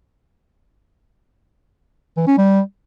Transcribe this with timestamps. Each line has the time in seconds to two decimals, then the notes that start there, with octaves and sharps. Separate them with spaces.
2.17 E3
2.27 C#4
2.38 G3